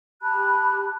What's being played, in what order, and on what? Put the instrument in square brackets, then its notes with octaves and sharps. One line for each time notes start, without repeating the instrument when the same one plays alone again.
[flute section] G4 A5 B5 F#6